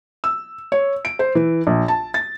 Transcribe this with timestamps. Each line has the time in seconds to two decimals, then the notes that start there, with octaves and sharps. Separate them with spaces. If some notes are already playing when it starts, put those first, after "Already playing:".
0.24 E6
0.72 C#5
1.05 D7
1.19 C5
1.35 E3
1.67 A#1
1.88 A5
2.14 A6